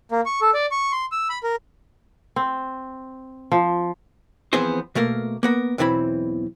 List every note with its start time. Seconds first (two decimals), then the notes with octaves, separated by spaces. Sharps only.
0.12 A#3
0.26 C#6
0.42 A4
0.54 D5
0.71 C#6
0.92 C6
1.12 E6
1.30 B5
1.43 A#4
2.36 C4
3.52 F3
4.53 E3 F3 B3 C4 G#4 C5
4.95 B2 A3 A#3 A#4
5.43 A#3 B3 A#4
5.78 B1 E2 E3 C4 E4 B5